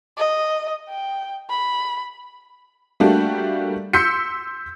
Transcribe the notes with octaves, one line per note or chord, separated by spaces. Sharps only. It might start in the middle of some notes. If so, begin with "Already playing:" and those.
D#5
G5
B5
G3 A3 A#3 D4 F#4 G4
C6 E6 G6 B6 C#7